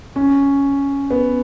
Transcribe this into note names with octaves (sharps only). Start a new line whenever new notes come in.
C#4
B3